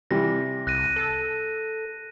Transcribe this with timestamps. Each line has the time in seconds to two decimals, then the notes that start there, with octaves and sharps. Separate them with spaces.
0.11 C3 E3 G3 A#6
0.67 C2 F#6 A#6 D#7
0.96 A4